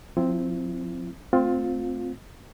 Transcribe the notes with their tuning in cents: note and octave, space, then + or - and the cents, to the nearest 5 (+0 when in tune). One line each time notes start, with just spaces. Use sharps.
F3 +30 C4 +0 E4 +40
A3 +0 C4 -5 F4 +20